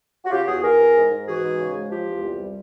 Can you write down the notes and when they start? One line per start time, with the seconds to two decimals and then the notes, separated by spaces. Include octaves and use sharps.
0.25 F#4
0.31 C#3 F4 G4
0.47 E2 F#4 G#4
0.62 E2 G#4 A#4
0.78 E2
0.95 G#2
1.10 G#2
1.26 E3 F#4 G#4
1.42 G#2
1.59 C#3
1.74 G#3
1.90 F3 F4 G4
2.07 E2
2.23 C2
2.38 G3